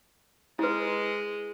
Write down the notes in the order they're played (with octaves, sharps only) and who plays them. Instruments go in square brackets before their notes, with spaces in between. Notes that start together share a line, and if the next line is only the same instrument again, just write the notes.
[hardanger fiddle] G#3 [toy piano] E4 B4